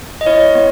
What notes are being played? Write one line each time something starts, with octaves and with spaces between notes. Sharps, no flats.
D#5
E4 C#5
B3